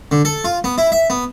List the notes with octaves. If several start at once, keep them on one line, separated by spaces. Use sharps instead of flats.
D3
A4
F4
B3
E4
E5
B3